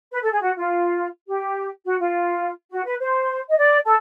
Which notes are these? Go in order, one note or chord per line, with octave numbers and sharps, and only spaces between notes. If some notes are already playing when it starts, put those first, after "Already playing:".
B4
A4
G#4
F#4
F4
G4
F#4
F4
F#4
B4
C5
D#5
D5
A4